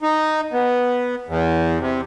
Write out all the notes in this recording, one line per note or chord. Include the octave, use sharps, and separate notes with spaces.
D#4
B3
E2
C3